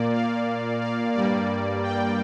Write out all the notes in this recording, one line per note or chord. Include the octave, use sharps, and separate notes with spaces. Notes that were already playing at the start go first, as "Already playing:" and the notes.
Already playing: A#2 A#3 D5
F5
F5
G2 G3 A#3 D5
G5